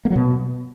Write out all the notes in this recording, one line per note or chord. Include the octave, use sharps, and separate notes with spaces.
A#3
F#3
B2